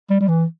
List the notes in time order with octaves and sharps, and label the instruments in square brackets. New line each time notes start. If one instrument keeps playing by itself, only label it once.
[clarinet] G3
G3
E3